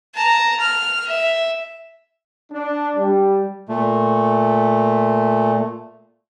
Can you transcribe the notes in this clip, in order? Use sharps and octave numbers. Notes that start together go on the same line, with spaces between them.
A5 A#5
F6
E5
D4
G3
A#2 A3